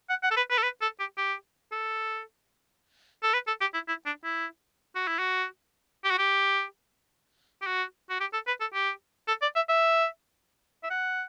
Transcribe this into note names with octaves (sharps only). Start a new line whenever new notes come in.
F#5
F#5
A4
B4
B4
A4
B4
A4
G4
G4
A4
A4
B4
A4
G4
E4
E4
D4
E4
F#4
E4
F#4
G4
F#4
G4
G4
F#4
F#4
G4
A4
B4
A4
G4
A4
D5
E5
E5
E5
F#5